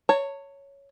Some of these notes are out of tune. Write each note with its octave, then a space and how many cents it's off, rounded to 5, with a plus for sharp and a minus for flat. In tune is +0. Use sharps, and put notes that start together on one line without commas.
C#5 +0 A5 +45